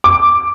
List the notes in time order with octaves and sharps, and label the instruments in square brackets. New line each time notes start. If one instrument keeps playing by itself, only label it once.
[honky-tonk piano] D6